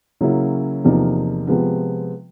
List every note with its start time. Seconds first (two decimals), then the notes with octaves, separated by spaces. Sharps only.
0.21 C#3 F#3 A#3 C#4 E4
0.84 E2 C3 F3 A#3 D#4
1.47 C3 F3 G#3 B3